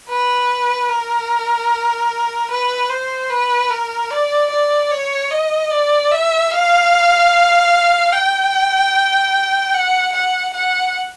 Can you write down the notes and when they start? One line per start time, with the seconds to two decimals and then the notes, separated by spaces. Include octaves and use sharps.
0.10 B4
0.89 A#4
2.51 B4
2.90 C5
3.30 B4
3.70 A#4
4.11 D5
4.50 D5
4.91 C#5
5.31 D#5
5.71 D5
6.11 E5
6.51 F5
8.13 G5
9.74 F#5
10.13 F#5
10.54 F#5